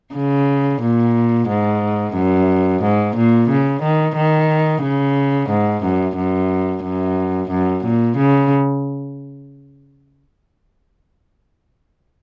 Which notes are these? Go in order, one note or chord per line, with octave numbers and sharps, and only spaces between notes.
C#3
A#2
G#2
F#2
G#2
A#2
C#3
D#3
D#3
C#3
G#2
F#2
F#2
F#2
F#2
A#2
C#3